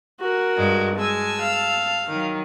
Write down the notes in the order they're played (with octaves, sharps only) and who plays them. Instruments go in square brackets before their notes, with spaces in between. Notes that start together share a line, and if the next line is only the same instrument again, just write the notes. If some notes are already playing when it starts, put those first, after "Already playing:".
[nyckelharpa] F#4 A#4
[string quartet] G2 G#3
[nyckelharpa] G#3 G#5 [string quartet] A5 E6
[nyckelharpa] F5
[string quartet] D#3 F#3